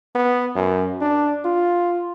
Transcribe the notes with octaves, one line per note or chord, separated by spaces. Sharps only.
B3
F#2
D4
F4